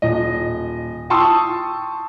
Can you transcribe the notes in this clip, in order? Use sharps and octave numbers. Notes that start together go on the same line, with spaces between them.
D#1 D#5
G5 A5 C6 C#6 D#6 E6